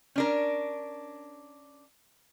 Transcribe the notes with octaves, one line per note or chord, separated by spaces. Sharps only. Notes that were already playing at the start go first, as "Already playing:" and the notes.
C#4 D4 A#4